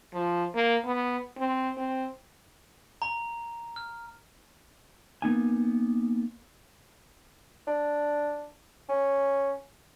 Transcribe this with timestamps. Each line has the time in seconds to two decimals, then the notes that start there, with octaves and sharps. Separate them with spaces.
0.14 F3
0.55 A#3
0.85 B3
1.38 C4
1.77 C4
3.02 A#5
3.76 F6
5.22 A#3 B3 D#4 G#5
7.67 D4
8.89 C#4